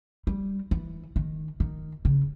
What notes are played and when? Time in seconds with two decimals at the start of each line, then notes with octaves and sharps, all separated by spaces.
0.27 G3
0.71 E3
1.16 D#3
1.60 D#3
2.05 C#3